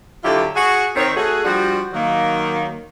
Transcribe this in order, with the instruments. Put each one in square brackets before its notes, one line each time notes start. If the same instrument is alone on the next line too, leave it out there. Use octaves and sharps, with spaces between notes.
[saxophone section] D3 F#3 E4 F4 G4 A4
F#4 G#4
D#3 C4 C#5
A3 F#4 G#4
F3 G3 D4 F#4
D#3 F#3 A#3